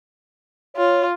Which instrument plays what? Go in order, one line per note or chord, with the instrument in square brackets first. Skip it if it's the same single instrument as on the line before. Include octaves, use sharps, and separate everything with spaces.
[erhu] F4 [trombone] C#5